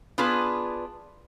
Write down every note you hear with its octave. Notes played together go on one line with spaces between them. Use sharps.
B3 D4 F4 G#4 B4